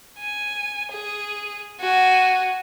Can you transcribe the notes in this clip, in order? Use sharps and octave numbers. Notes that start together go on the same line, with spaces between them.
G#5
G#4
F#4 G#5